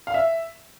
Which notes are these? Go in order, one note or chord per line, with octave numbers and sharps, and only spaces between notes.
F5
E5